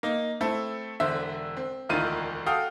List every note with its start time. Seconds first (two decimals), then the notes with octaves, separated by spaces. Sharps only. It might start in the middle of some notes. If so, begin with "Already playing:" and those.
0.03 A#3 D#4
0.41 A3 C4 E4 A4
1.00 E1 D3 C5 E5
1.57 C4
1.89 E1 D2 D#3 E4 F4 D#7
2.46 F#4 A4 F5 G5 D#6